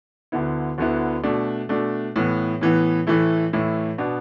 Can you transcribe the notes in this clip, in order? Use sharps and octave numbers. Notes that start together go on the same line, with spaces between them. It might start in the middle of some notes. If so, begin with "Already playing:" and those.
D2 D3 B3 E4
D2 D3 B3 E4
B2 A3 D4
B2 A3 D4
A2 E3 B3
A2 E3 B3
A2 E3 A3 E4
A2 E3 A3 E4
B2 B3 D4